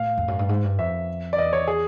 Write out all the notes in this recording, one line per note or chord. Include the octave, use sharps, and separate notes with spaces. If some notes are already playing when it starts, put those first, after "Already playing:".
Already playing: A2 F5
F2
F#2
G2
G#2
G2
F2 E5
D5
E2 D#5
C#5
G#4